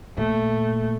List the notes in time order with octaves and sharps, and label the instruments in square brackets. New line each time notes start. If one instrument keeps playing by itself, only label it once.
[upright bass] A#2 [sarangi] A3